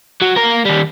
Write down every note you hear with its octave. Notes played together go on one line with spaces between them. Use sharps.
F#3
A#3 A#4
D#2 G3